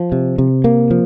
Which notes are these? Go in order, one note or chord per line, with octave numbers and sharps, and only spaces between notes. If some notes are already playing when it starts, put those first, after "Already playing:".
Already playing: F3
C3
C3
A#3
F3